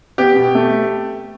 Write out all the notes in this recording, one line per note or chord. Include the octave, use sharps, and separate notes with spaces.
B3 G4
B2
A3